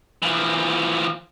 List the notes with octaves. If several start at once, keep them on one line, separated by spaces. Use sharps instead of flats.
E3 F3